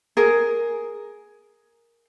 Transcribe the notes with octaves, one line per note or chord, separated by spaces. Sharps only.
G#4 A#4